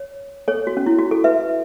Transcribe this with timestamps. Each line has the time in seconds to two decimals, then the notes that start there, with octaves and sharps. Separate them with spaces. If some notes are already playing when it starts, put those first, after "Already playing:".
Already playing: C#5
0.48 A4 C#5
0.67 F#4
0.77 C#4
0.86 E4
0.99 F#4
1.11 A4
1.24 B4 E5